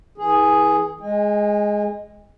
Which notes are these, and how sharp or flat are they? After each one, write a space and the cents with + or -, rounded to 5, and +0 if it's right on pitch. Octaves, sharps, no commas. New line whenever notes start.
E3 -35 G#4 +0
G#3 +0 G#5 -35